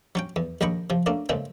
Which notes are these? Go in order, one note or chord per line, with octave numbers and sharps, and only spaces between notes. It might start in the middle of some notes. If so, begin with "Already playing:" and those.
F#3 C#4 G5
E2
A#1 D#2 D#5 G5 B5 C#6
C3 F3
A3 A#3 C#4 D4
A#2 C#3 G#3 A3 C4